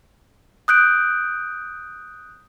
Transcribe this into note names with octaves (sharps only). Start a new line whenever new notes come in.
D#6 F#6 G6 D7